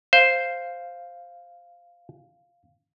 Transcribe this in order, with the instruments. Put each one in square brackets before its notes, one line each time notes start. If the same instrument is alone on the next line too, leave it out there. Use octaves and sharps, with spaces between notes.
[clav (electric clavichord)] C5 [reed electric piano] F5